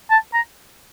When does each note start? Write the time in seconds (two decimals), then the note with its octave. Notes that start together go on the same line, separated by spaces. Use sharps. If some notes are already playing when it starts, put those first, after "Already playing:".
0.11 A5
0.34 A#5